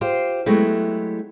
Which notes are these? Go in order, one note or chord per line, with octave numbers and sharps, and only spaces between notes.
F4 G4 C5
F#3 G#3 A3 B3 E4 G4